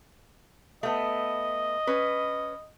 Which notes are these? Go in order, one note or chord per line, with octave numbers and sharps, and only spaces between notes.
A3 B3 D#5
C#4 B4